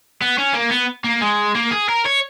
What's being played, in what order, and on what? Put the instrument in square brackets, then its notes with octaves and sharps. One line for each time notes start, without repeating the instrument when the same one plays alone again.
[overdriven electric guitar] B3
C#4
A#3
B3
A#3
G#3
A#3
G#4
A#4
C#5